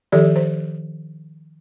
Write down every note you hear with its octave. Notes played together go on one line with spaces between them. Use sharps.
D#3 F3 G4 A4 D5
C5